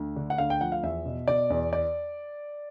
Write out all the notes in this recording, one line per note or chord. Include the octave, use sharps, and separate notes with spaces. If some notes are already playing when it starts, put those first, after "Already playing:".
Already playing: D2
D3
F#5
D2 F5
G5
F3 F#5
F5
E2 E5
B2
B2 D5
E2
D5